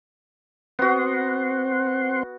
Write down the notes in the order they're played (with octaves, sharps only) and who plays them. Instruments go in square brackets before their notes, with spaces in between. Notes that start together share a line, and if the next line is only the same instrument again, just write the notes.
[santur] B3 F#4 [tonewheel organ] C4 F#5 C6